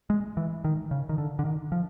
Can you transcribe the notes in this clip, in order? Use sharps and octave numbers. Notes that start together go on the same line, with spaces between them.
G#3
E3
D#3
C#3
D#3
D3
D3
D#3
F3